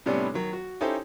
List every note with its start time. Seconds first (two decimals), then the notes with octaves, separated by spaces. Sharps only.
0.06 A2 C3 G3 B3 C#4 D4
0.34 D#3 F#3
0.53 F#4
0.81 C#4 D#4 E4 G4 A4 C5